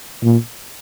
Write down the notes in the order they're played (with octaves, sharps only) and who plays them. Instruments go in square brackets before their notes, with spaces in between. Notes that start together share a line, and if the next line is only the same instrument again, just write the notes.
[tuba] A#2